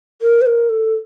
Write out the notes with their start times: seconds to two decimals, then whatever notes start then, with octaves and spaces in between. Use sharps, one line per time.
0.22 A#4
0.41 C5
0.46 A#4
0.69 A4